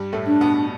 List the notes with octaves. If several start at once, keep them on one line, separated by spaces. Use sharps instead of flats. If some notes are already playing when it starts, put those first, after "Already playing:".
Already playing: G2 G3
A2 A3
D4
B2 B3